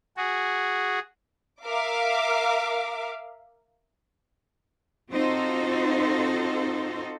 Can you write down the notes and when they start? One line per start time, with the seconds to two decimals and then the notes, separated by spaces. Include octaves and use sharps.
0.17 F#4 G#4
1.64 A#4 E5 F5 D6
5.11 C4 D#4 F4 F#4 A4 C5